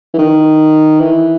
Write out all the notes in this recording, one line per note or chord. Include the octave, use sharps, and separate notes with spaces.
E3
D#3
E3